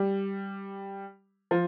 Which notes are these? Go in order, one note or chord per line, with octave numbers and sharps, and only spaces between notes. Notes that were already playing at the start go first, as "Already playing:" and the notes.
Already playing: G3
F3